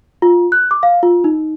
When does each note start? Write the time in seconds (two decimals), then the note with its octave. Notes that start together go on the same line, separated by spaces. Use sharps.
0.22 F4
0.52 F#6
0.71 D6
0.83 F5
1.03 F4
1.24 D#4